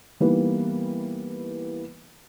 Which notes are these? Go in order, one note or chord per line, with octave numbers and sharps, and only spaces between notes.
E3 G3 A#3 B3 D#4 B4